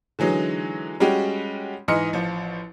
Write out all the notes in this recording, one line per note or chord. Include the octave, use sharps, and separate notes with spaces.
D3 E3 F#3 G#3 D#4
G3 G#3 C#4 F#4 G4
G#2 E3 D#5 C6 F6 C#7
A1 F3